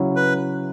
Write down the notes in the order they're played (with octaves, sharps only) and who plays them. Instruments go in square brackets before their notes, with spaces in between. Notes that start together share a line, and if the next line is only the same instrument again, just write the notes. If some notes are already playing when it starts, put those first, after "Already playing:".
Already playing: [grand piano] C#3 F#3 C#4 E4
[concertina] B4